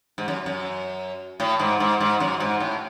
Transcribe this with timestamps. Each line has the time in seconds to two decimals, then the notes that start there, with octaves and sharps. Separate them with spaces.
0.18 G#2
0.28 F#2
0.46 F#2
1.40 A2
1.60 G#2
1.80 G#2
2.00 G#2
2.20 F#2
2.40 G#2
2.60 A2